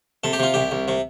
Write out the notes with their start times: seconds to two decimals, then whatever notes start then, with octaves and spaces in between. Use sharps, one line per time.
0.24 C3 A4
0.33 G4
0.39 C3 F4
0.54 C2 G4
0.71 C2
0.88 C3